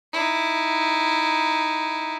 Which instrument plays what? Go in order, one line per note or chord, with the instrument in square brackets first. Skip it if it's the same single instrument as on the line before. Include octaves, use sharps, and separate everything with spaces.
[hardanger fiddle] D#4 E4